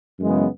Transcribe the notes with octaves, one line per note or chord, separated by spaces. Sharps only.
F#2 C#3 E3 G#3 B3